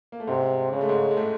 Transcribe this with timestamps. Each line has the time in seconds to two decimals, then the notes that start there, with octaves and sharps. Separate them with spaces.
0.12 A#3
0.20 A3
0.27 G#2 C3 G#3
0.72 C#3 G#3
0.81 A3
0.89 G#2 G#3
1.11 G#3
1.17 A2 A3